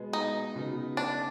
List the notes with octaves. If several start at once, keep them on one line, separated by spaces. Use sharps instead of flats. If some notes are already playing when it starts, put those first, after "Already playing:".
Already playing: B2 G#3 B3
D#4
C#3 F#3 B3 D#4
D4